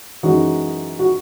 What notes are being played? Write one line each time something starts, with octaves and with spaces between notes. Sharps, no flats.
F#2 E3 G#3 D#4 F#4
F#4